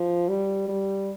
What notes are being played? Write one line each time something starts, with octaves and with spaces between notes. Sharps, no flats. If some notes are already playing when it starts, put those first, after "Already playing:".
Already playing: F3
G3
G3